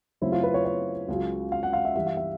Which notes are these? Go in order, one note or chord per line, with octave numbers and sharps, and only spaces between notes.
F#2 C#3 F#3 A3 C4 E4
F4
B4
C#5
C#5
C#2 C#3 F#3
F5
F#5
F5
E5
G2 E3 G3 E5
F5
E5